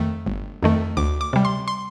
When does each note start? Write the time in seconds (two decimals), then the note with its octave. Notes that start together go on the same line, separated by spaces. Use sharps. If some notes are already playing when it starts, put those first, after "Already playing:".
Already playing: F2 D#3 A3
0.26 G1
0.63 F2 D#3 A3
0.97 D2 D6
1.21 D6
1.33 C3 G3
1.45 C6
1.68 C6